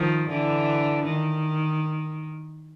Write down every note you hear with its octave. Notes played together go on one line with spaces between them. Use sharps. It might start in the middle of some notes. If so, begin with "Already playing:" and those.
Already playing: D#3 F3
D3 E3
D#3